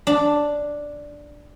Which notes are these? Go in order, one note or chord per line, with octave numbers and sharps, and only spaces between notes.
D4